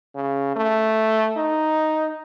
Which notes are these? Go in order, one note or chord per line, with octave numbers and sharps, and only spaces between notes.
C#3
A3
D#4